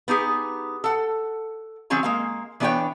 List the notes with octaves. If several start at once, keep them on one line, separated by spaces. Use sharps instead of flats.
B3 D#4 G4 G#4
A4 F#5
D#3 F#3 C4 C#4 G#4 A#5
G#3 A#3 F5
E3 B3 D4 G4 C#5 G5